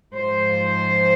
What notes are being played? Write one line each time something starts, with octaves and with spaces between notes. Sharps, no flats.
G#2 F3 C5